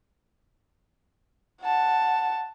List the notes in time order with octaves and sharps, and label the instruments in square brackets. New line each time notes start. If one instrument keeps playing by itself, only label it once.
[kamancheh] F#5 A5